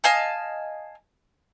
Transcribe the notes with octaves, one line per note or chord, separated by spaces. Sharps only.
D#5 F5 G#5 A5